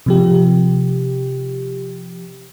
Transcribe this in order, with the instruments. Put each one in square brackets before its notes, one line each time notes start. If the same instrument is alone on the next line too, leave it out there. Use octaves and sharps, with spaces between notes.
[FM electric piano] C3 F3 G4